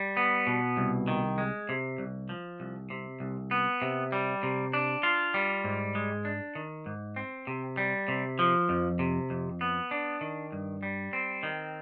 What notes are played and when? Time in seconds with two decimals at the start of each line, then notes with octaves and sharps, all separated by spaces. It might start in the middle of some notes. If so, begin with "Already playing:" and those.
Already playing: G3
0.17 B3
0.47 B2
0.77 C2
1.08 D#3
1.38 G#3
1.69 C3
1.98 C2
2.29 F3
2.60 C2
2.90 C3
3.20 C2
3.51 B3
3.82 C3
4.12 G3
4.43 C3
4.73 D4
5.03 F4
5.34 G3
5.64 G#2
5.95 G#3
6.25 D4
6.55 D#3
6.86 G#2
7.16 C4
7.47 C3
7.77 G3
8.08 C3
8.39 F3
8.69 F2
8.99 C3
9.30 F2
9.61 B3
9.91 D4
10.21 D#3
10.52 G2
10.83 G3
11.13 C4
11.43 D#3